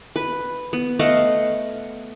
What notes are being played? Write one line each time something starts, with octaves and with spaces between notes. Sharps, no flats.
B4
B3
A3 D#5 F5 F#5